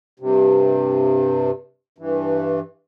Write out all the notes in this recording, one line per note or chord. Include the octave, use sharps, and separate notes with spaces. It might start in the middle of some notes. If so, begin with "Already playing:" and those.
G2 C3
G2 E3